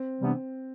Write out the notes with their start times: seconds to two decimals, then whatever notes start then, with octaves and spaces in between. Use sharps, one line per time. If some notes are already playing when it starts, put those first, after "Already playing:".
Already playing: C4
0.20 C3 E3 G3 B3 D4